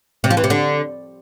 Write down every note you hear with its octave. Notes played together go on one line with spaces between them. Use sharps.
C3
F3
E3
C3
D3